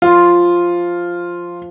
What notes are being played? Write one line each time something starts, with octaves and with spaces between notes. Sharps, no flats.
F3 F4